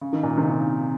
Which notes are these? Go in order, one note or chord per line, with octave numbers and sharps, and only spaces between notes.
C#3
D#3
A#2 C#3
C3 D#3